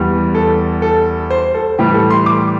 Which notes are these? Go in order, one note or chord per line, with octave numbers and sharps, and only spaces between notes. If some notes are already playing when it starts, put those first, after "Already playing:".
Already playing: E2 E3 G3
A4
A4
C5
A4
A2 E3 G3 G4
A4
C6
D6